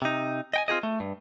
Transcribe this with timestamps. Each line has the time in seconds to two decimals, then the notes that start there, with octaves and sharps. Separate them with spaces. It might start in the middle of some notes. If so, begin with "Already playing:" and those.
0.02 C3 D#4
0.53 D#5 G5 G#5
0.68 C4 F4 G4 G#4 D#5
0.83 A3
1.00 G2